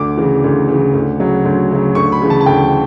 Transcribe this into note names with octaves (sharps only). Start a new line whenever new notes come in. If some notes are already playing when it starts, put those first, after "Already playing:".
Already playing: D2 D6
C#3 E3
D2
C#3 E3
D2
C#3 F#3
D2
C#3 F#3
D2 C#6
B5
C#3 E3
A5
A5
D2 G5